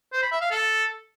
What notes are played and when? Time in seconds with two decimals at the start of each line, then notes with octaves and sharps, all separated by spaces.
0.13 C5
0.22 B5
0.32 E5
0.41 F5
0.51 A4